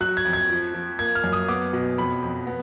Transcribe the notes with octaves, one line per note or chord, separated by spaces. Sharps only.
F#3 F#6
G#6
F2
G#6
F3
F3
A#3 G#6
F6
F#2
D#6
B3 D6
B2
F2 B5
F2
B3